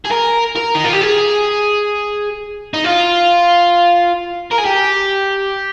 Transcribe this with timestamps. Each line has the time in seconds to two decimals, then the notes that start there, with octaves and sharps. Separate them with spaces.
0.05 G#4
0.12 A#4
0.56 A#4
0.75 D#4
0.84 F4
0.93 G4
1.01 G#4
2.74 D#4
2.84 F4
4.52 A#4
4.58 G#4
4.66 G4